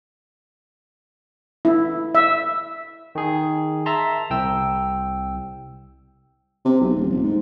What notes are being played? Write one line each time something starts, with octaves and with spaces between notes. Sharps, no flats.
E4
E5
D#3 G#4
E5 A5 A#5 C6
C2 G5 E6
C3
B1
D#1
F1
G#2